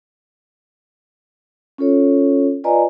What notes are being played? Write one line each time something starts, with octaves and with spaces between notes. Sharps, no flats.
C#4 F4 A4 C#5
F4 B4 D5 D#5 G#5 A#5